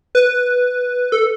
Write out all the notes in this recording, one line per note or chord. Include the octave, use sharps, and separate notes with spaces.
B4
A4